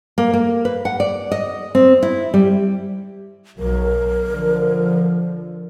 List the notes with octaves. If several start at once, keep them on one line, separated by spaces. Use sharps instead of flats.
A#3
A#3
B4
F#5
D5
D#5
C4
E4
G3
B1 F#3 A#4
D3 F3